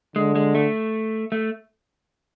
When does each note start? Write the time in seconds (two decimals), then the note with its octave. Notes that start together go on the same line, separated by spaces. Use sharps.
0.16 D3 G#3
0.36 G#3
0.55 A3
1.32 A3